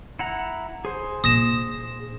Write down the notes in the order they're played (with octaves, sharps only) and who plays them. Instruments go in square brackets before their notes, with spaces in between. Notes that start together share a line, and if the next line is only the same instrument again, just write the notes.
[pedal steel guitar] E4 F#5 A#5
G#4 C5
[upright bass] A#2 D4 [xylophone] D#6 A#6 E7